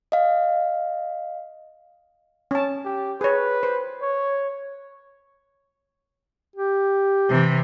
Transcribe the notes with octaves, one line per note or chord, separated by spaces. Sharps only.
D#5 F5
C#4 A5
G4
G#4 B4 C#5
C5
C#5
G4
C3 E3